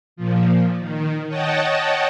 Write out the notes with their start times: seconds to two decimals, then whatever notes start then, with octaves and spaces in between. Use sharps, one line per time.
0.16 A#2 F3
0.79 D#3
1.28 C#5 D#5 F#5 G5 A5